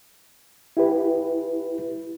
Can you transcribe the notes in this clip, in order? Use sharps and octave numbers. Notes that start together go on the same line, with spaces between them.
E4 G4 B4